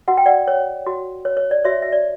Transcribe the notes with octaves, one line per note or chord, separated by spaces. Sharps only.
F#4 F#5
G5
D5 F#5
C#5
F#4
C#5
C#5
D5
F#4 C#5 E5
E5
D5